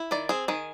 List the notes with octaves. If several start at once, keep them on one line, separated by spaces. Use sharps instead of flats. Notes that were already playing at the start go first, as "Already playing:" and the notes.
Already playing: E4
D#3 D5
C4 G#4
D#3 G#4